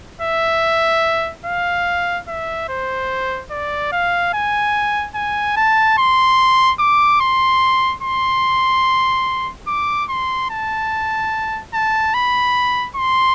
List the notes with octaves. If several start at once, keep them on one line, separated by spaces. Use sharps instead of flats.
E5
F5
E5
C5
D5
F5
G#5
G#5
A5
C6
D6
C6
C6
D6
C6
A5
A5
B5
C6